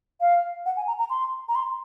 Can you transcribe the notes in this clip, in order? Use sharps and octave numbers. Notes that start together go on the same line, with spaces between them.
F5
F#5
G#5
A#5
A#5
C6
A#5
C6